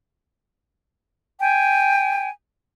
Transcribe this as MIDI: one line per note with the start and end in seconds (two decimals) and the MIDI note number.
1.40 2.29 79
1.40 2.29 80